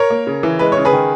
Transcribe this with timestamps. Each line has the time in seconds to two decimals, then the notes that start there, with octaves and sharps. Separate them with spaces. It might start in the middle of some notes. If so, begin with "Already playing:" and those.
Already playing: A#4 C#5
0.10 A#3
0.27 C#3
0.43 E3
0.59 G#3 B4
0.72 C#3 C#5
0.85 G#4 B4
0.92 D#3